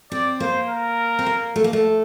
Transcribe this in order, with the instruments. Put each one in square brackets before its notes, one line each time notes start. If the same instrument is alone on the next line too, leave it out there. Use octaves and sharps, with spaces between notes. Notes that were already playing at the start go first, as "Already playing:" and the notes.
[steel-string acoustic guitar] C4 [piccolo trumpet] D5
[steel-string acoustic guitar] A#3 [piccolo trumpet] C5
[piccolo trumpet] A#4
[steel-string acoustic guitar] C4
A#3
A3
A#3
A3